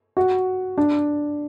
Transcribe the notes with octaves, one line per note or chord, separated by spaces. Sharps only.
F#4
D4